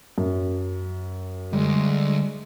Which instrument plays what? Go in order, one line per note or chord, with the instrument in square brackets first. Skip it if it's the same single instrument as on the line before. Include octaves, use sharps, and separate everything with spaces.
[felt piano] F#2
[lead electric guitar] D2 [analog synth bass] G3 [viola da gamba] G#3